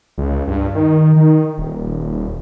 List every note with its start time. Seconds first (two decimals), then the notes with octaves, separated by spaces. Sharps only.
0.18 C#2
0.48 G2
0.75 D#3
1.16 D#3
1.58 D#1